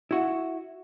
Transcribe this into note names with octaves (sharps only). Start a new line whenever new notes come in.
E4 F#4 E5